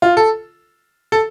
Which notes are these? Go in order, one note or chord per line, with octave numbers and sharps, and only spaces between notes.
F4
A4
A4